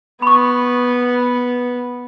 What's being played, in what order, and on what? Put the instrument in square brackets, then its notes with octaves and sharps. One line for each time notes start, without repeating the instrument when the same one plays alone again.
[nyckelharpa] B3 [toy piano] B5 C#6